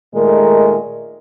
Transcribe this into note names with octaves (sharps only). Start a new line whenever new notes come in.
A#2 D#3 G#3 A3 A#4